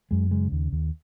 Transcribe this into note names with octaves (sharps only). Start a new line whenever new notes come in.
F#2 G#3
C#3 G#3
D#2
D#2